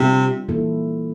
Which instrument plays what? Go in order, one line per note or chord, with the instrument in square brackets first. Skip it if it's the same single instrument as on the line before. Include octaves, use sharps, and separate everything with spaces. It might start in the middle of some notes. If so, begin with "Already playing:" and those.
Already playing: [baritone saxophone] C3 [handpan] G3 D4 F4
[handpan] E3 A#3 E4 A4